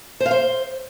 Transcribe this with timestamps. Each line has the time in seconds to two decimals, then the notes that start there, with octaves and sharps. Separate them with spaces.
0.20 C5
0.26 F5
0.31 C5